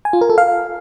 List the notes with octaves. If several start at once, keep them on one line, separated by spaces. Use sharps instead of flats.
G#5
F4
A#4
A4
F5